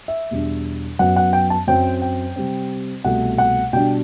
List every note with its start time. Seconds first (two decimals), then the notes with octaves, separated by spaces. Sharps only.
0.08 E5
0.31 E2 B2 G3 D4
0.99 F#2 F#3 B3 F#5
1.16 F#5
1.33 G5
1.50 A5
1.67 F#2 F#3 C4 G5
2.02 G5
2.36 C3 G3 C4
3.04 C2 B2 A3 F#5
3.38 F#5
3.73 B2 G3 D4 G5